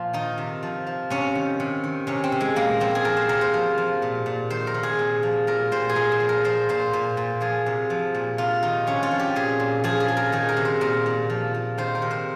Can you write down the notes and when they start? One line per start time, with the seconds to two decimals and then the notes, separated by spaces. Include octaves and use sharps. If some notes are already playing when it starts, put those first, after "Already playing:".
Already playing: A#2 F3 F4
0.13 D#3 D#4
0.38 C3
0.63 F3
0.87 F3
1.10 C3 C#4
1.35 D#3
1.60 C3
1.84 D#3
2.07 C3 C#4
2.24 C4
2.32 C3
2.40 G#3
2.56 A#2 A#3
2.80 F3 C4
2.95 G#4
3.05 F3 A#4
3.17 C5
3.29 C3 A#4
3.41 C5
3.54 F3
3.78 F3
4.02 A#2
4.26 A#2
4.50 D#3 C5
4.67 A#4
4.74 C3
4.83 G#4
4.99 A#2
5.23 F3
5.47 A#2 A#4
5.72 A#2 C5
5.89 G#4
5.95 A#2 A#4
6.12 C5
6.20 F3
6.29 A#4
6.44 F3 C5
6.69 A#2 C5
6.93 A#2
7.17 A#2
7.41 F3 G#4
7.66 C3
7.90 F3
8.15 A#2
8.38 C3 F4
8.63 D#3 D#4
8.87 C3 C#4
9.03 F4
9.11 F3
9.19 G4
9.36 A#2 G#4
9.60 A#2
9.84 F3 G#4
10.00 G#4
10.08 F3
10.17 A#4
10.32 D#3 G#4
10.49 A#4
10.57 C3
10.65 C5
10.81 A#2 A#4
11.06 A#2
11.30 F3
11.54 F3
11.78 D#3 C5
11.95 A#4
12.02 C3
12.11 C5